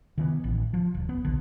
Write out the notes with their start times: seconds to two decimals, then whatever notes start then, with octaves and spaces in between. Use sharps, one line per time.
0.18 D#3 E3 B3
0.44 A1
0.73 F3
0.94 D#1
1.09 B3
1.24 A#1 D3